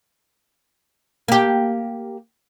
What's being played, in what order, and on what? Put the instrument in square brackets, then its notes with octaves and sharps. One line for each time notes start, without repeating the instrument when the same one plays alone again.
[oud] A#3 G4